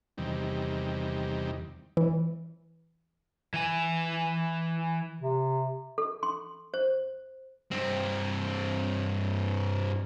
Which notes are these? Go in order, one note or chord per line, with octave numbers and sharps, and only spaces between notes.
E2 C3 D#3 G3
E3
E3 G#5
C3
A4
C6
C5
G2 C4